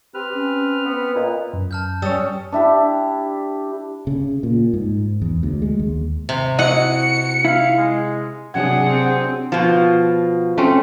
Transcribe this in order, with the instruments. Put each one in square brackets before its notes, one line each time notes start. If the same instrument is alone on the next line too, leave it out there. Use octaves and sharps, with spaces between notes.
[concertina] C4 B4 F6 [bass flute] G4
[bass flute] C#4
[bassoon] B3
[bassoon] A#2 [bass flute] D#5
[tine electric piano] F#2
[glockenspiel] A5 F6 G6
[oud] G3 C#4 [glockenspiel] A5 D#6 E6
[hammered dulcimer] D4 E4 G4
[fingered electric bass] C#3
A#2
G#2
E2
D2
G#3
D#2
[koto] C3
[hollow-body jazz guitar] E4 D#5 [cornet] F#4 [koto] F#5 [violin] C#7
[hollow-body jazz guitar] E4 [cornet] F5
[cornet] G#3
[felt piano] C3 F#3 G#6 [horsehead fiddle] D4 G#4 [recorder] F#5
[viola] C4
[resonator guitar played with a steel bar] B2 F3
[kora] A3 C4 C#4